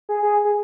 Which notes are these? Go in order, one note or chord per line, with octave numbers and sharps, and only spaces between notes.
G#4
G#4
G#4